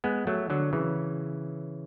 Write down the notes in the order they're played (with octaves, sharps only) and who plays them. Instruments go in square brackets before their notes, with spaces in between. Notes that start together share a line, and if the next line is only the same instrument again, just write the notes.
[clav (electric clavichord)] G#3 B3
F#3 A3
D3 F#3
C#3 E3